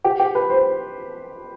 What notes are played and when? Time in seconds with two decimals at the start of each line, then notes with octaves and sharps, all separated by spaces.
0.04 G4
0.20 G4
0.35 B4
0.50 C5